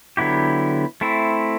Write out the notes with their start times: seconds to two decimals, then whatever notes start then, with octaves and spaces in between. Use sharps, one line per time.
0.17 D3 F#3 B3 E4 G4
1.01 A3 C4 E4